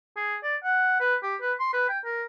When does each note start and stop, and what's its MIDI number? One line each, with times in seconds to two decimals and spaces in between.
0.17 0.36 68
0.43 0.56 74
0.64 0.98 78
1.00 1.15 71
1.23 1.36 67
1.41 1.53 71
1.59 1.70 84
1.73 1.86 71
1.89 1.99 79
2.05 2.23 70